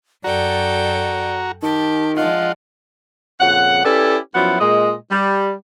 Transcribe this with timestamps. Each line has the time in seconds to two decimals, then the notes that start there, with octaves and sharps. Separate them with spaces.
0.24 F#2 F#4 A4 D5 G5 A#5
1.62 D#3 G4 A5
2.17 F3 G#3 D4 F4 D#5 F#5
3.41 F2 A#2 C#3 F#5
3.85 C#4 E4 G4 A4 B4 D5
4.35 F#2 F3 F#3 B3 E4 F#5
4.60 A#2 G#3 D#5
5.11 G3